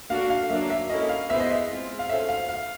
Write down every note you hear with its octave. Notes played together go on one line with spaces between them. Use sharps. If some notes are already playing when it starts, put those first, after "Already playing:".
A#3 D4 F#4 A4 F5
F5
F#3 A#3 D4 E5
E5
A#3 C#4 E4 A4 D#5
F5
B3 E4 G#4 C5 E5
D#5
E5
G#3 C4 F4
F5
C#4 F4 A4 C5 E5
F5
F5